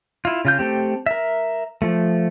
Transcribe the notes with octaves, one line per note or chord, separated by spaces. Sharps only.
E4 F4
C#3 F4 G6
A3 C4 G4
A#4 E5
F3 A3